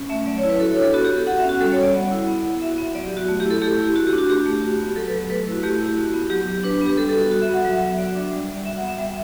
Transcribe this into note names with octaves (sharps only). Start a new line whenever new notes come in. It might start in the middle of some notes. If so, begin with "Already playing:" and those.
Already playing: C#4
A3 E5
F#3 D5
C#5
E4
B4
F#4 A4
D4 C#5
A4
B3 F#4
G4
B3 A4
F#4 F#5
E5
C#4
F#4
G3 A4
C#5
G3
D5
B3 F#5
E4
B3
E4
F#4 E5
B3
F#3 D5
G4
F#3 F#4
A3
E4 G4
A4
A3 G4
E4
F#4
G4
D4
F#4
A3 G4
A3
F#4
B3
F#3 A4
F#3 B4
A4
A3 B4
E4 F#4
A3 G4
E4
G4
E4 F#4
B3
F#3 G4
F#3
D4 B4
B4
B3 G4
G3 A4
A4
F#4
F#4
E5
B3
F#5
F#3 E5
F#5
F#3
E5
F#4 D5
D4
G3
G3
F#4 E5
F#5
B3
E5
G3 E5